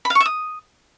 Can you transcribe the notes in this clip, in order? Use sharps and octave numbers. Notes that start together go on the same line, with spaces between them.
B5
F5
C#6
E5
D#6